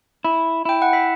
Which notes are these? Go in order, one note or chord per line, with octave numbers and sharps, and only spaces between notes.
E4
E4 G5
F#5
E5